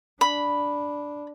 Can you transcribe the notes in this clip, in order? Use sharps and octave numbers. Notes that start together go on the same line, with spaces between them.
D4 B5